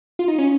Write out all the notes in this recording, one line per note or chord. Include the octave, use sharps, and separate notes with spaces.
F4
D#4
C#4